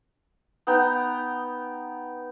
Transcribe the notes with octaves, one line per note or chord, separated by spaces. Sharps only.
B3 D#4 G5 A#5